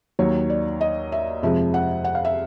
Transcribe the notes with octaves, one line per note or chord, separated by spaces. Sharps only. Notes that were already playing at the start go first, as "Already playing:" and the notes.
D#2 D#3 F#3 C#5
D5
D#5
E5
F2 C3 F3 G#3 E5
F#5
F#5
F5
E5